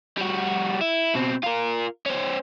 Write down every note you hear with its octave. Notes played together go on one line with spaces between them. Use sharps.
G3 F#4
E4
B2 C4
F4 A#4
C#4 C5